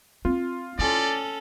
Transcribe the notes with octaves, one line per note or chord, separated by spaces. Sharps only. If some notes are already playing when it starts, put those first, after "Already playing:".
C4 F4
C#4 E4 A4 D5